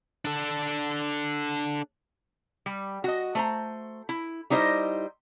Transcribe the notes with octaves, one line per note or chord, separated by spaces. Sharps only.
D4 A4
G3
F#4 D#5
A3 C5 A#5
E4
G3 D#4 E4 C5 D#5